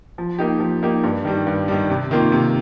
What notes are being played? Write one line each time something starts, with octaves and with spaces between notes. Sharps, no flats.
F3
A#3 D#4 G4
F3
A#3 D#4 G4
G2
D#3 G3
G2
D#3 G3
C3
D#3 A#3 F4
C3